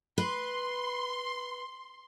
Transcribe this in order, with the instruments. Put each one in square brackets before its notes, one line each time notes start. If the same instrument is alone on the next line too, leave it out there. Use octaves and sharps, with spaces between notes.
[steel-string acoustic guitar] B4 [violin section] C6